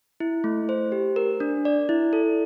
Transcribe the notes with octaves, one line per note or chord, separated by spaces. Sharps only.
E4
A3
C5
G4
A#4
D4
D5
E4
A4